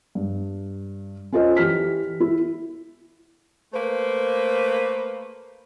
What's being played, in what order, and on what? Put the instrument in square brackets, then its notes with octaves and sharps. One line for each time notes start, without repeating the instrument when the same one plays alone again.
[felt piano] G2
C#4 F4 A4 C5 D#5
E3 G4 F6 B6
E4
[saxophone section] A3 A#3 B4 C5